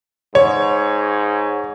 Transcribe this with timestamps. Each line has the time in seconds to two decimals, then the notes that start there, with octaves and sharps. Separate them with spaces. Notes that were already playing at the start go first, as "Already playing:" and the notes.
0.35 G#2 C#5